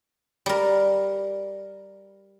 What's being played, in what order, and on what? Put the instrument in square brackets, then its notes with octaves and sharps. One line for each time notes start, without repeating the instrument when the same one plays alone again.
[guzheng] G3 A#4